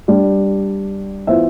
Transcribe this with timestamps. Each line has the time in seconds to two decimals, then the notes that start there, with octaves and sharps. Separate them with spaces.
0.08 G3 D4 G4 D5
1.27 E3 B3 F4 C5 E5